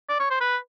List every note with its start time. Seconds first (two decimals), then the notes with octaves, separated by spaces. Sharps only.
0.09 D5
0.19 C#5
0.30 C5
0.40 B4